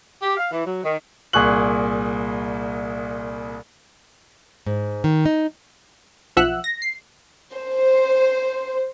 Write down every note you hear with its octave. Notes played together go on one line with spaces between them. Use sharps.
G4
F5
E3
F#3
D#3
C2 A#2 G#4 C#6 F#6 F#7
G#2
D#3
D#4
B1 F3 E5 F#5 E6 F#6
A#6
C7
C5